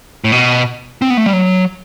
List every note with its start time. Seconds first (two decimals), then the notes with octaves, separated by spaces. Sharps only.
0.24 A2
0.32 B2
1.02 C4
1.10 B3
1.17 A3
1.26 G3
1.33 F#3